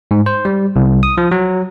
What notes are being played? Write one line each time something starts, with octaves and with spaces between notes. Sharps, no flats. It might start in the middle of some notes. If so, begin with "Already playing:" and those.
G#2
C5
G3
C2
D#6
F3
F#3